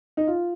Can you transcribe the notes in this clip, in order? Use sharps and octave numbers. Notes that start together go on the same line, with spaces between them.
D#4
F4